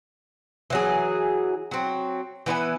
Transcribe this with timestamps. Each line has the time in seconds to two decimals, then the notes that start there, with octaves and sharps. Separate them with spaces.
0.70 E3 F#3 G#4
1.71 F#3 C4
2.46 E3 B3 E4 G#5